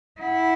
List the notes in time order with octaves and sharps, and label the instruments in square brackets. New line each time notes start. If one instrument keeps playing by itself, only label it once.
[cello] E4 [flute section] F#5